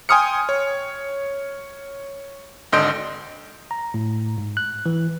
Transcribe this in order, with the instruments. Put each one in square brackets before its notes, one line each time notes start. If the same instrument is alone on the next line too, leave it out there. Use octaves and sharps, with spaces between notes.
[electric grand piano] G5 G#5 C6 D#6 F6 C#7
C#5
G#1 D3 D#5 C6 G6 D7
[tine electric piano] A#5
A2
G#2
F#6
E3